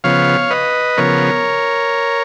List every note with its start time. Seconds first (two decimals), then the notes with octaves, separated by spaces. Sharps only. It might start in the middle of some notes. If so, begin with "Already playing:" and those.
0.04 C#3 F3 B3 C#5 F5
0.50 B4 D#5
0.97 C#3 F3 B3 A#4 C#5